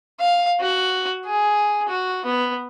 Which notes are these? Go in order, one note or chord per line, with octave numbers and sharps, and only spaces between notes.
F5
F#4
G#4
F#4
B3